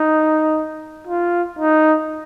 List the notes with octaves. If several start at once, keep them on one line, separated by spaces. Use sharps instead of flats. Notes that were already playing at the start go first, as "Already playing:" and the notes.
Already playing: D#4
F4
D#4